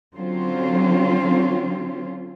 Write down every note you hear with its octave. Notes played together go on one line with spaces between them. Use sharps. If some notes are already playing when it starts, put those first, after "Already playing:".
D3 F#3 C4 C#4 F4 C5